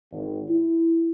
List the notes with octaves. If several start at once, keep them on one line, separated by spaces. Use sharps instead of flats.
G#1
E4